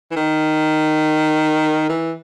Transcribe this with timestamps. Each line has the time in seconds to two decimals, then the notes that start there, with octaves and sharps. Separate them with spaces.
0.11 E3
0.16 D#3
1.89 E3